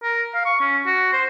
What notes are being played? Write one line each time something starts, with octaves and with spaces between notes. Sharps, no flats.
A#4
F5
C#6
C#4
F#4
C5